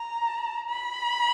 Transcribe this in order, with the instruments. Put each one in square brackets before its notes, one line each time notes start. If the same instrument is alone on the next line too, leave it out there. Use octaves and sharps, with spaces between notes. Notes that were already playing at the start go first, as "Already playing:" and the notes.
Already playing: [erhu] A#5
B5